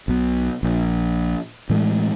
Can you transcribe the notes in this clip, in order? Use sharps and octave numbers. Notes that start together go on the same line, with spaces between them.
B1 B2
A#1
A2 E3 G#3 A3